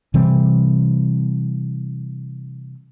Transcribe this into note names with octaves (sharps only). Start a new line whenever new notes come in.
C3 E3 G3 C4